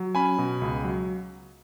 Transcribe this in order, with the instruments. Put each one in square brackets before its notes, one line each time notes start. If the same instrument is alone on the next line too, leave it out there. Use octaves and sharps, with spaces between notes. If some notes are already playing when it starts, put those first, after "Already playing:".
Already playing: [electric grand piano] F#3
C#4 G#5 B5
B2
C#2
F#3